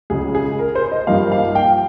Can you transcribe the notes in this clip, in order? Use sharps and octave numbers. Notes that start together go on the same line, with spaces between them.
C#2 C#3 G#3 G#4
G#4
A#4
C5
D#5
G2 F3 A#3 D#4 F5
F5
G5